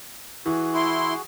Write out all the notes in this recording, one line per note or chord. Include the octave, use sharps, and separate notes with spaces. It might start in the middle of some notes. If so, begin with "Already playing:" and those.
E3 F#4 G#4
E4 C6